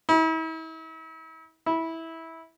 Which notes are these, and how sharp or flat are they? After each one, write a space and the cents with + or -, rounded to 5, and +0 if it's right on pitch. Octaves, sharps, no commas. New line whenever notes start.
E4 -40
E4 -15